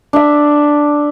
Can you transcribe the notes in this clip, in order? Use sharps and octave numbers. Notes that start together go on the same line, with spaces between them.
D4 E5